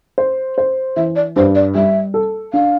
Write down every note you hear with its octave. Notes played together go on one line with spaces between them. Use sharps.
C5
C5
E3 E5
D5
G2 C5
D5
G3 E5
A4
D4 F5